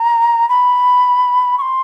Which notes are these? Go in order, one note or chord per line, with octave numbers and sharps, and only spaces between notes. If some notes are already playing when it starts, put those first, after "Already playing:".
Already playing: A#5
B5
C#6
C6